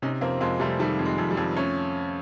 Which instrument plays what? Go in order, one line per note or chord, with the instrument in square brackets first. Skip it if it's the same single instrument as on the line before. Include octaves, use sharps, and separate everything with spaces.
[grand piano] C3 [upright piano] C#4 D#4
[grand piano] F2 [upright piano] A#3 C4
[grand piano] F2 [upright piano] G#3 A#3
[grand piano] C3 [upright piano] G3 A3
[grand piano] D#3 [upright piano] G3 A3
[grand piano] F2
[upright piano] G#3
[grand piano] F2
[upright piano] G3
[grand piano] F2
[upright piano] A3 [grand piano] C#4